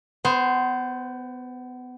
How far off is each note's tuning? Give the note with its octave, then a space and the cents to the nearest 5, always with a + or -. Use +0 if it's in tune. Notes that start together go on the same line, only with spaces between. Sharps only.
B3 +25 C5 +0